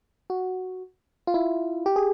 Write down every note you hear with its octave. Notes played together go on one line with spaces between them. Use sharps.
F#4
F4
E4
G4
G#4